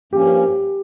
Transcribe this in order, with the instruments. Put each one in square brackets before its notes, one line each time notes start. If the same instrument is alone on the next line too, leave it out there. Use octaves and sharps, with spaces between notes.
[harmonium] G2 F3 A#3 C#4 [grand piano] G4